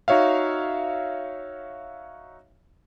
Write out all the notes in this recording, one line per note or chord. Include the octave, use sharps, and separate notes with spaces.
D#4 F#4 C#5 E5 F5